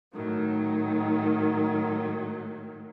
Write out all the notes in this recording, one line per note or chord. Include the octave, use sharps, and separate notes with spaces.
A2 D#3 F#3